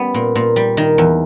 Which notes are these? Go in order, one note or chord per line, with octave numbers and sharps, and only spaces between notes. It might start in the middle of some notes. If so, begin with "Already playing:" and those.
Already playing: G3 B3 C#4
A#2
A#2
G3
D#3
E2